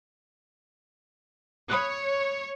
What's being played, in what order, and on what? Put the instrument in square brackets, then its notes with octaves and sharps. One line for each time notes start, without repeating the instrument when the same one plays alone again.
[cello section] C#5 [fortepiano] B5 D#6 F#6